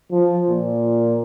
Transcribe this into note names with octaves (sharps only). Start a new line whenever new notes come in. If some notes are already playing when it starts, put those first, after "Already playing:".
F3
A#2